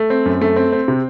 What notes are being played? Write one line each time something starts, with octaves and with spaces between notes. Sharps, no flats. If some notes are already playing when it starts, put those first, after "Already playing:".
Already playing: A3
C4
F#2
A3
C4
C4
C3